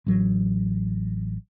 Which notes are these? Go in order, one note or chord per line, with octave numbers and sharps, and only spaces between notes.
A1 F#3